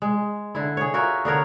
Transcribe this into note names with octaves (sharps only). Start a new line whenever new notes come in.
G#3
D3 E4
G#4 C#5
F4 F#4 A#4 E5
D3 B3 A#4 C#5